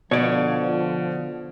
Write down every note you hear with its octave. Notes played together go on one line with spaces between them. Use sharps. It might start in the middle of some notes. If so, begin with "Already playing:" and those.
B2 D3 F3 C#5 D5